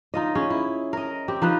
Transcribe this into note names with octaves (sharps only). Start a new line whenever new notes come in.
D#4 F4 D#5
C#4 G#4
E4
A#4 D#5
C4 G4
F3 D#4 B4